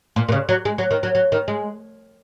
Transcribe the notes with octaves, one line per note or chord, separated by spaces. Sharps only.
A#2
A#2
C#3
F#3
G#3
F#3
D#3
F#3
F#3
D#3
G#3